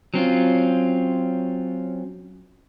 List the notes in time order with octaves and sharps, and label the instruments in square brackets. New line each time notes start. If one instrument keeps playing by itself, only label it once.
[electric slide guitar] F#3 C4 C#4 F4